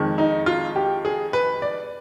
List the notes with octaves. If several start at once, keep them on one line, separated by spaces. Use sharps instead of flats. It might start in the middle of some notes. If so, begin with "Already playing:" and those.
Already playing: F2 D#3 G#3
D#4
F4
G4
G#4
B4
D5